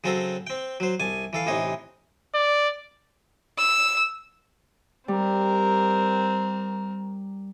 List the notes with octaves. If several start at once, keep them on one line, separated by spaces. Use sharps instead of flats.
C#3 F#3 C4 A4 A#5
C4 G5
F#3 C5
C2 G#5 A5
E3 A4 F5
A1 C3 E3 D#4 C#5
D5
E6
G3 C4 A#4